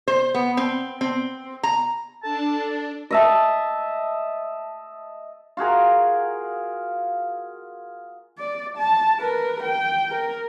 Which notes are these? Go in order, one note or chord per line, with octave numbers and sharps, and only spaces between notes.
C5
B3
C4
C4
A#5
D4 A4 A5
D#5 E5 A5
F4 F#4 G#4 A#4
D5
A5
A#4 B4
G5
A#4